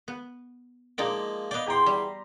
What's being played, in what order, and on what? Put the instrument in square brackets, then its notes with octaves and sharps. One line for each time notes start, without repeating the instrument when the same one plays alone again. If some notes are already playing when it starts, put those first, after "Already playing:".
[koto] B3
[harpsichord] F3 G#3 A#3 [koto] D#4 D5 G5
[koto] B3 D5 [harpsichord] D#5 F5 G5
[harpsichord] E2 G5 [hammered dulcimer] G4 A#5 C6
[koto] G3